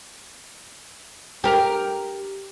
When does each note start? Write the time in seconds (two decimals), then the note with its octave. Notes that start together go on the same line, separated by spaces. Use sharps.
1.44 G4 A#4